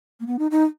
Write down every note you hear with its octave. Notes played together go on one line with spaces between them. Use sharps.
A#3
B3
D#4
D#4